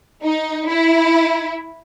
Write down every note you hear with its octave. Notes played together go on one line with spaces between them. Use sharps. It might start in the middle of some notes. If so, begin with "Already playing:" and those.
D#4
E4